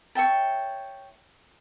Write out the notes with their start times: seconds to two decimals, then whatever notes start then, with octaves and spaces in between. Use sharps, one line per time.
0.15 C#5 E5 G5 A5